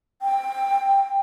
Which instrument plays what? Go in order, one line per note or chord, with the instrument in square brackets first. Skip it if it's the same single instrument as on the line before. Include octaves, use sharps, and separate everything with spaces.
[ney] G5